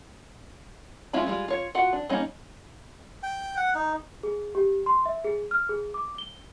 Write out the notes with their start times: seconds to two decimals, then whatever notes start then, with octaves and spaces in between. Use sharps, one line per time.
1.13 G#3 C#4 E4 F4 B5
1.27 G3 G#3 F4
1.48 F4 C#5
1.75 F4 F#4 F#5
1.93 D4
2.09 G3 A#3 C#4 D#4
3.23 G5
3.56 F#5
3.75 D#4
4.23 G#4
4.55 G4
4.86 C6
5.06 E5
5.24 G#4
5.51 F6
5.69 G#4
5.94 D6
6.18 G7